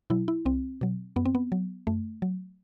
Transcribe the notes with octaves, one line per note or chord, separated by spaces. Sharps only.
B2 F#3 E4
E4
C2 C4
B2 F#3
F#2 B3
C4
B3
F#3
F#2 A3
F#3